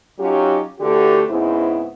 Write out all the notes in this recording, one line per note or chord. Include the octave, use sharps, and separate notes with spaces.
F#3 C#4 D#4 F4 G4
D3 E3 A3 F#4 G4
G#2 C#3 B3 C4 E4